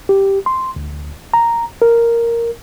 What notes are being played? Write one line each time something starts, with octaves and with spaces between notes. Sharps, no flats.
G4
C6
D2
A#5
A#4